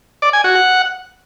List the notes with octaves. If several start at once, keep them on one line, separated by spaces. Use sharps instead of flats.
D5
G#5
F#4
F#5